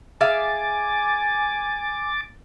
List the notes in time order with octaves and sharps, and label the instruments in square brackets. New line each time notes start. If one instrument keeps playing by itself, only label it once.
[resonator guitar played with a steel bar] G#4 E5 F5 [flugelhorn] G#5 [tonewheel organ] D6 A6